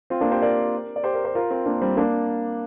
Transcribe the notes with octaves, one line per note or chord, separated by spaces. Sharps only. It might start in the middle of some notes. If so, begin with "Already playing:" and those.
C4 F4
A#3 D4
G4 C5
A#4 D5
D5
G4 C5
A#4 D5
G4 C5
F4 A#4
C4 F4
A#3 D4
G3 C4
A#3 D4